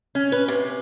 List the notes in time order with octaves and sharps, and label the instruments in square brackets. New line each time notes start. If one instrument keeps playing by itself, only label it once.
[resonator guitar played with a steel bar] C#4
[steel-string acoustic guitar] B4
C3